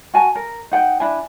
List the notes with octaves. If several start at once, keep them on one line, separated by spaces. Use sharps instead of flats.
F#4 G#5 A5
A#4
D#4 F#5 G5
D4 E4 G#5